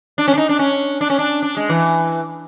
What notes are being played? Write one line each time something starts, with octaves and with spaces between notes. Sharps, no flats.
D4
C#4
D4
D#4
D4
C#4
D4
C#4
D4
D4
G#3
E3